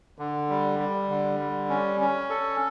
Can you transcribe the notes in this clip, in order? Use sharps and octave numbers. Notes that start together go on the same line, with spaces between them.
D3
G3
G3
D3
G3
C#4
C#4
A4